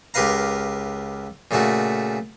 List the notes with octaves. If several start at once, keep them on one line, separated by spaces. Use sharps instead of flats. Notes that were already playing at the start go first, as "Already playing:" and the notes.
C#2 G4 A#4 B4 F5 A#5
A#2 C#3 A3 F#4